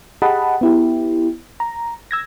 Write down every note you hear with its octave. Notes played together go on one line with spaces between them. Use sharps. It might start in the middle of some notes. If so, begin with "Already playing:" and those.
G4 G#4 D#5 F#5 A5 B5
B3 E4 G4
A#5
E6 G#6 A#6